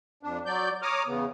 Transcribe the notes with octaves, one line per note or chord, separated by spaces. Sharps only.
F2 D4
F#3 D5 G6
C#5 A#5 D6 D#6 F6
E2 C#3 B3